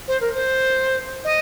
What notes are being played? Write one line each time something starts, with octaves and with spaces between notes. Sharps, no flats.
C5
A#4
C5
D#5